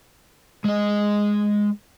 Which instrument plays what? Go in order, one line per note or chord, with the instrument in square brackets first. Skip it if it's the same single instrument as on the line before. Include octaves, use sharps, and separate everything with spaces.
[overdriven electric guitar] G#3 D#5